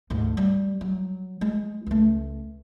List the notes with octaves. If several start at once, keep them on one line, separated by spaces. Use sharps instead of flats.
D2 G#2
G3
F#3
G#3
C#2 A3